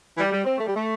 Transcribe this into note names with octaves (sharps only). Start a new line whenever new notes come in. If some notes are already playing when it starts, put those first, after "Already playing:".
E3
G3
G3
C4
A3
G3
A3